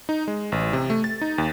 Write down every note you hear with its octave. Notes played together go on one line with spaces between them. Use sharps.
D#4
G#3
A1
C3
A3
A6
D#4
D#2